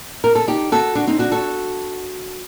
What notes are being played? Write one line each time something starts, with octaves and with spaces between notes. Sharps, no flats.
A#4
A4
D#4 G4
F#4 A4
D4 F#4
C4 D#4
D4 F#4
F#4 A4